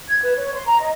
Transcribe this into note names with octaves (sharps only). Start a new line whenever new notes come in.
G#6
B4
C#5
C6
A#5
D#5